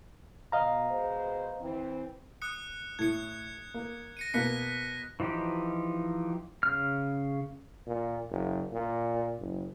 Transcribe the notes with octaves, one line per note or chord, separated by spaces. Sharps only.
B2 D#5 F5 A#5
B2 G#3 C5
E3 C4
D#6 F#6 C#7
A2 G#6 C#7
A#3
A#6 C#7 D#7
B2 A#3 F#6 B6 C#7
E3 F3 D#4 G4
C#3 F6
A#2
F#1
A#2
F#1